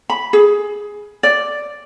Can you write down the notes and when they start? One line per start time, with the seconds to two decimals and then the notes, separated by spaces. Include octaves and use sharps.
0.10 B5
0.33 G#4
1.23 D5